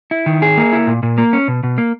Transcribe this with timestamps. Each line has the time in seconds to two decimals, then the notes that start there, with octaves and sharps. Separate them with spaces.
0.11 E4
0.26 D#3
0.42 G#4
0.57 A#3
0.73 E4
0.87 A#2
1.03 A#2
1.18 A#3
1.33 C#4
1.48 B2
1.63 B2
1.78 A#3